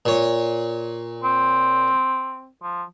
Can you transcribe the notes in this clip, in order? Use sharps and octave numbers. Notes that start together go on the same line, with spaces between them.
A#2 C#5
C4
F3